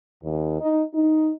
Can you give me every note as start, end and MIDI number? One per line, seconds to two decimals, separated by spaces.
0.23 0.58 39
0.60 0.83 63
0.94 1.31 63